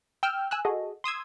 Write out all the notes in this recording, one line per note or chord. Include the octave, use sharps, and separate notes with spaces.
G5 E6 F6 G6
G#5 E6 F#6
F#4 G#4 A4 D#5
C6 D#6 E6 G#6